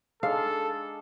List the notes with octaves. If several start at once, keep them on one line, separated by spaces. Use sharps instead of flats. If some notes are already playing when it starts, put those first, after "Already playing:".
G#3 D4 D#4 A4 F5